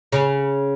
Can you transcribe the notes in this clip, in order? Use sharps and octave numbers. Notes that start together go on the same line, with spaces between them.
C#3